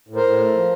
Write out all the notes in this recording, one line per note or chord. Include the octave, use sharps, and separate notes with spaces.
A2
A#4 C5
A2
A3
F3